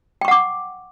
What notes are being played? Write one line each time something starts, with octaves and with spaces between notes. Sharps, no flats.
F#5 G5 C#6 D6